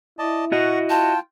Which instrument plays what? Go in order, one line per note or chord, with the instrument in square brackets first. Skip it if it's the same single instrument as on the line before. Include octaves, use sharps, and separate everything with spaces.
[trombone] E4 [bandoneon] D5 D#5 A5
[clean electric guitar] F#4 D#5 [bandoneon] F#5 C#6
[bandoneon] F4 G5 [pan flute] A5